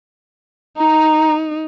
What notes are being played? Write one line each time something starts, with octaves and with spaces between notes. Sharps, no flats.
D#4 A#5